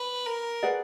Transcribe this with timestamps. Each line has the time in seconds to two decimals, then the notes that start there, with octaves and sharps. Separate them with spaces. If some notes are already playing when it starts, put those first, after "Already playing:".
Already playing: B4
0.26 A#4
0.63 G#4 B4 D5 F#5